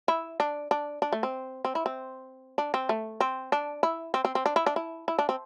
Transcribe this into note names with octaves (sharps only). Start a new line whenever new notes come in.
E4
D4
D4
D4
A3
C4
C4
E4
C4
D4
C4
A3
C4
D4
E4
C4
C4
C4
D4
E4
D4
E4
E4
D4
C4